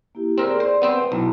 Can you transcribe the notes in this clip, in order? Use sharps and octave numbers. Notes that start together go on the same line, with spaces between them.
A#3 E4 G4
C4 G#4 A#4 D5
C5 D5
B3 C4 B4 C5
B1 E4 A#5